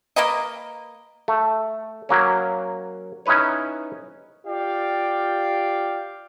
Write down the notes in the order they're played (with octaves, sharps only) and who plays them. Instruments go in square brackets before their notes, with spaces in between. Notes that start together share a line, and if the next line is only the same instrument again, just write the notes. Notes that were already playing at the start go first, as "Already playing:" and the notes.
[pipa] A#3 A#4 B4 D#5
[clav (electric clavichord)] A3
F#3 A#3 C#4
C#4 D#4 E4 B4 C#5
[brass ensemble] F4 G4 D5 F5 G5